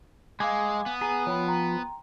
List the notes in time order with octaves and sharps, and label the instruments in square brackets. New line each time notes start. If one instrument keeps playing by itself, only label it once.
[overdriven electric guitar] G#3 [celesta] F5 D6 [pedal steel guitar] G#5
[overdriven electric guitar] B3
[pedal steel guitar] G#4 [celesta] A#5
[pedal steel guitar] F3 [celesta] C#5 G5 B5
[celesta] G5 A#5 C6